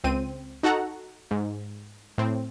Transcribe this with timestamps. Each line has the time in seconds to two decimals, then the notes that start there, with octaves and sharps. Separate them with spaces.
0.04 C#2 C4 D#7
0.63 D#4 F#4 A4 F#5 A#5
1.31 G#2
2.18 A2 C4